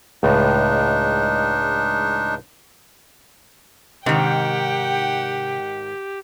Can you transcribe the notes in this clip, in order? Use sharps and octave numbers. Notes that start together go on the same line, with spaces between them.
C#2 A2 G#3 D4 D#4
G#2 C3 D#3 G4 F#5 G5